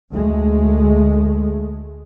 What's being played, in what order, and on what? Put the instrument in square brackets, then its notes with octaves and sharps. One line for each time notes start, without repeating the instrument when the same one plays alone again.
[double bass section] D2 G#3 A3